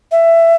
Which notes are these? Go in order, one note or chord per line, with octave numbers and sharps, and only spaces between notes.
E5